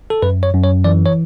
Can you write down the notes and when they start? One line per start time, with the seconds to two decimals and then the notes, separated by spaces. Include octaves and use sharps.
0.10 A4
0.22 F#2 B4
0.43 C#5
0.54 F#2
0.64 C#5
0.84 E3 D5
1.06 C#5